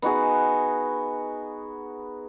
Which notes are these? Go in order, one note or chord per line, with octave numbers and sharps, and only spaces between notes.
B3 D#4 F#4 G#4